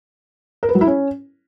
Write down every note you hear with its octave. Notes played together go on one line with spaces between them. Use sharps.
A#4
B4
F#3
E4
C#4